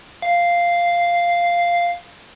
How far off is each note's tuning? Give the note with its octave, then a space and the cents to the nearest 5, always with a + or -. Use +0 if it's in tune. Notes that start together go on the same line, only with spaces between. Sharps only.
F5 -5